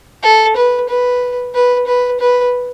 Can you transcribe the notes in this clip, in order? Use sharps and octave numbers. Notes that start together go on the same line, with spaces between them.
A4
B4
B4
B4
B4
B4